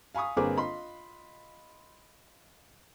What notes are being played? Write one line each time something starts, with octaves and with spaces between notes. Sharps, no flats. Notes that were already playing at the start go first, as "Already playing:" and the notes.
F5 G#5 B5 C#6 D#6
G1 A#3 C4 G#4 B4 D6
F4 D#5 B5 C6